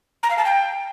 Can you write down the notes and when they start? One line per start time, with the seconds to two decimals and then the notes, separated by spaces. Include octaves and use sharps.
0.23 A#5
0.30 F5
0.38 A5
0.45 G5